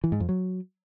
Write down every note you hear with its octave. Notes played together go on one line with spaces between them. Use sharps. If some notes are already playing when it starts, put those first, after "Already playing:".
E3
G#2
F2
F#3